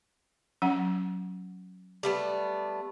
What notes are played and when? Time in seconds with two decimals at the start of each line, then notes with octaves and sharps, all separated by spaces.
0.62 F#3 C#4 F#5
2.03 G3 A3 B3